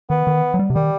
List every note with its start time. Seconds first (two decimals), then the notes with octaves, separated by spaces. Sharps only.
0.10 D#3 B3
0.27 D#3
0.54 F#3
0.59 G3
0.70 C3
0.75 D#3 G3